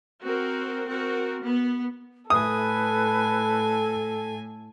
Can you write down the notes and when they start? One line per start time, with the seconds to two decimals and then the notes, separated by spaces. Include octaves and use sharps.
0.22 C4 F#4 A#4
0.86 C4 F#4 A#4
1.42 B3
2.30 A2 A4 B4 G#5 D#6